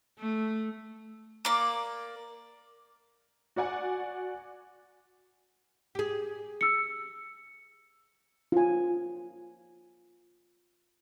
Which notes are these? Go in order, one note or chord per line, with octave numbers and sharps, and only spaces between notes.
A3
A#3 D5
F#4 D5 F#5 G#5
G4 G#4
E6 C#7
F4 G#5